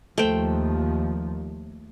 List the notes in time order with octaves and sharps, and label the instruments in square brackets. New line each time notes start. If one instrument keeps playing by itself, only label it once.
[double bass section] D#2 F3 [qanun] A3 C5 G5